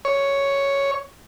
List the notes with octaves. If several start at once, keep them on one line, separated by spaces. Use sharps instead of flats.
C#5